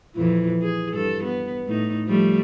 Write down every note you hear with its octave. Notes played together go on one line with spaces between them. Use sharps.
F2 A#2 E3
G#4
G2 A4
B3
A2 A3 D#4
F3 G3 A3